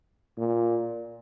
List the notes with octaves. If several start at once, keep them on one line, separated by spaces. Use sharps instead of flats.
A#2